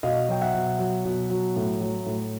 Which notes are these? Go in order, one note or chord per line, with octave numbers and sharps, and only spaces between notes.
B2 D#5 F5
F#3 G5
E5 F#5
B2
F#3
B2
F#3
A2
F#3
A2